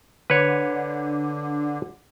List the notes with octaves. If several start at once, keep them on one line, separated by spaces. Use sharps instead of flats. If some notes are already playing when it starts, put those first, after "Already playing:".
D3 B4 C#5